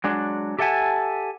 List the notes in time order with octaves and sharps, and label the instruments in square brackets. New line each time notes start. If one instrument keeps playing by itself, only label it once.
[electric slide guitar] F#3 G#3 D4
G4 A4 E5 F#5 G#5 A5